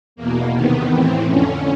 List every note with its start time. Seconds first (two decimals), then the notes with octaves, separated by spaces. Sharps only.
0.16 E2 B2 A#3
0.52 E2 C3 D#3 B3
0.89 A2 E3 C4
1.24 F2 D3 C#4